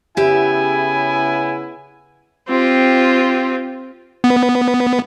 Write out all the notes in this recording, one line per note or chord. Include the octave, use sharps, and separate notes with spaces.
C#3 B3 E4 G4 E5 G#5
C4 F4 G4
B3